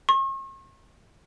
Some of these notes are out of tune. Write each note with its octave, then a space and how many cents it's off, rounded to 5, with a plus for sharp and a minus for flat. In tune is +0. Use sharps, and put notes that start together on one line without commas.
C#6 -45